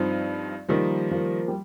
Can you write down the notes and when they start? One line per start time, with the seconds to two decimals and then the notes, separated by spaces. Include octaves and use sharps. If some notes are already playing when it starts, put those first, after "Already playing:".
Already playing: G2 F3 C4 D#4
0.69 D#3 F3 G3 A#3 D#4
1.11 F3 A#3
1.48 G3